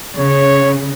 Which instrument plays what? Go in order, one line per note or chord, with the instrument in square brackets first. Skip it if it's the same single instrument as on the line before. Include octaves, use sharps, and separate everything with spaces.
[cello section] C#3 [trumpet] C#5